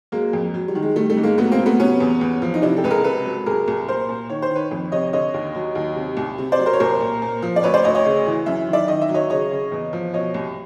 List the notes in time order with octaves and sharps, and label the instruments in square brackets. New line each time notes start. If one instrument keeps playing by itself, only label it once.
[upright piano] F#3 G#3 A#3
F2
F#3
G3
D#3
G#3
D#3 G3 A3
G3 A3
G#2
G#3 A#3
F#3 A3 B3
A#3 C4
F#3
A3 B3
C3 B3 C#4
E2
E2
F3
D#4
C3 D4 E4
G4 A4
C#2 B4
G#4 A#4
C3 A4 B4
F#3
C2 G#4 A#4
C2
A#2 A#4 C5
A#2
D#3 C#5
C5
D#3
B4 C#5
F2
C3 C#5 D#5
D3 C#5 D#5
D#2
F#3
D#2
C3
C2
C3
C5 D5
F#3
A#4 C5
C#5
C2 A#4 C5
A#2
A#2
F3
D5
D2 B4 C#5
C5 D5
D2 C#5 D#5
C#5 D#5
C#3
E3
F#2 E5
D#3
D5 E5
D#3 D#5
E5
F#3
C#5 D#5
C#3 C#5 D#5
C#3
E2
F3
B2 C#5 D#5
C2